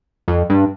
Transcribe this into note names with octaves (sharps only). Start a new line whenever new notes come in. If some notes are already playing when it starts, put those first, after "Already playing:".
F2
G2